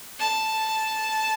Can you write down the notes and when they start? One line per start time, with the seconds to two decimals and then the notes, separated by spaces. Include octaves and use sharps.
0.19 A5